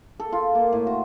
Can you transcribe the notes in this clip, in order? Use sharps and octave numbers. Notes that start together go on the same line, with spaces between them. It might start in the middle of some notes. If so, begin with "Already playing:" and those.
A4
F4
A#3
A2
F#4